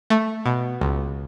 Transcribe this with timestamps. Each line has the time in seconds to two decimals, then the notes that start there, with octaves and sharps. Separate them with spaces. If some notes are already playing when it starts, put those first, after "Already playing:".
0.10 A3
0.46 B2
0.81 C#2